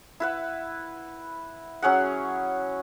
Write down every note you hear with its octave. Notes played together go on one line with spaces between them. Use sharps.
E4 B4 F#5
F#3 C#4 G#4 F#5